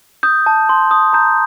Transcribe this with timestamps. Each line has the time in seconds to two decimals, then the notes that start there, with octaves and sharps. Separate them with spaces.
0.23 D#6 G6
0.46 A5
0.69 C6
0.91 D#6
1.13 A#5 G6